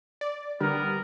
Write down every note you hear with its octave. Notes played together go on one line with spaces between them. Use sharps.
D5
D3 G3 B3 A#4